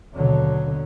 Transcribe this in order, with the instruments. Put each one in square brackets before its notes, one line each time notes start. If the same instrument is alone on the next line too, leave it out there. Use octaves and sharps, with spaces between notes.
[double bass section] D#2 B2 D3 F#3